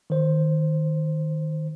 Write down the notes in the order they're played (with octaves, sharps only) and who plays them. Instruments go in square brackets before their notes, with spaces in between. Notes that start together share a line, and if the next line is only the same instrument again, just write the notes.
[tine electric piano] D#3 C5